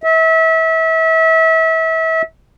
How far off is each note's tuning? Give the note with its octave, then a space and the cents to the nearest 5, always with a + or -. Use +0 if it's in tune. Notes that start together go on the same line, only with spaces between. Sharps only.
E5 -30